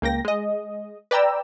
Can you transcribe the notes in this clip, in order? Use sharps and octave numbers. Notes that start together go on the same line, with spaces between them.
C#2 A#3 G5 A#6
G#3 D#5
B4 D5 G5 A#5 E6